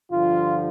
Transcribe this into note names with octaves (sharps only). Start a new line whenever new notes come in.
G2 D3 F3 F4